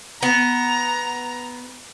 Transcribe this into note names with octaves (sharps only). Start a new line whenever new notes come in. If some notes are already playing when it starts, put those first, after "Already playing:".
B3 A#5